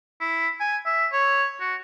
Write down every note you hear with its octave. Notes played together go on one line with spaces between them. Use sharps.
E4
G#5
E5
C#5
F#4